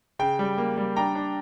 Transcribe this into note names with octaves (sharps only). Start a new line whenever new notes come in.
C#3 G5
G3
A#3
G3
D4 G5 A#5
D4